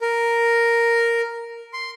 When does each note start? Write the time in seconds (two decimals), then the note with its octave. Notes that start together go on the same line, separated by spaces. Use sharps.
0.01 A#4
1.73 C6